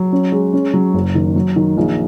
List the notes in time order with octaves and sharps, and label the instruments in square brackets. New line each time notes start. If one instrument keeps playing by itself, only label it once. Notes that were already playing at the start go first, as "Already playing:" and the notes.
Already playing: [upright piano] F#3
C#4
G#3
C#4
F#3
F#1
D#3
F#3
D#3
A#1